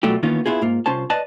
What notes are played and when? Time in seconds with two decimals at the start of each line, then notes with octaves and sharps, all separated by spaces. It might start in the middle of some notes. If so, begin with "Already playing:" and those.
0.03 B2 F#3 G3 A3 F4 G4
0.23 D#3 E3 A#3 B3 C#4 F4
0.46 B3 E4 F4 G#4
0.62 G#2 A#3 F4
0.86 C2 C#4 F4 C5 A5
1.10 B4 D5 D#5 A5